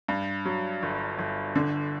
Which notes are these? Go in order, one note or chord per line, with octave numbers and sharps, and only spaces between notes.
G2
F#3
G1
G1
D3